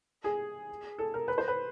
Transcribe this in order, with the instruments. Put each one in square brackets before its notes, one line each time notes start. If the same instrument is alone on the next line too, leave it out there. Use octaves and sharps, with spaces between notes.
[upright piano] G#4
A4
A#4
B4
C5
B4